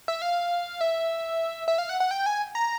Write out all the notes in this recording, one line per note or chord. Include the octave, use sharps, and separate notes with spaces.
E5
F5
E5
E5
F5
F#5
F#5
G5
G#5
A#5